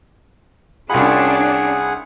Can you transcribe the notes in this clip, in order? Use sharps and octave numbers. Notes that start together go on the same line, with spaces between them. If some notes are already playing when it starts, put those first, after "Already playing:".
C2 C#4 D4 F4 G#4 F#5 B5